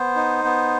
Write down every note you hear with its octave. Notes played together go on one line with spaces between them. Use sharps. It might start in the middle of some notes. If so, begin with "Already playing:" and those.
Already playing: B3 C5
D#4
B3